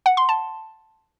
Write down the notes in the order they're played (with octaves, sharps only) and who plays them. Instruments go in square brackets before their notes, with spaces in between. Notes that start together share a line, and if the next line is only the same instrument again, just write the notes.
[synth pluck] F#5
C6
A5